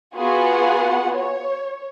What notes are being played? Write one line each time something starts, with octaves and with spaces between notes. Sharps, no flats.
B3 F4 F#4 G#4 F#5
C#5